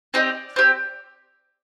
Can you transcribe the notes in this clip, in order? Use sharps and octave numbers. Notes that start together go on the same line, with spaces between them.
C4 D#4 G4 D5
C4 G4